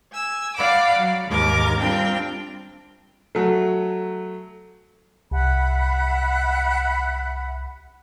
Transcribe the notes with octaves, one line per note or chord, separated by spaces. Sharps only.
G#5 E6
D5 F5 F#5 B5 D6
F#3
D#2 G#2 A#4 D6
G3 C4 D4 F4 A#4 G5
F#3 A3
C2 E5 F#5 B5